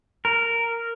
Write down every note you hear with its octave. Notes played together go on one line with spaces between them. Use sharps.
A#4